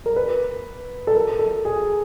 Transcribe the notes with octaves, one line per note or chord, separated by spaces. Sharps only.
A#4
B4
A4
A#4
A4
G#4